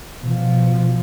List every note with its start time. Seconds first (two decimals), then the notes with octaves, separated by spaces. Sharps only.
0.21 B2 F3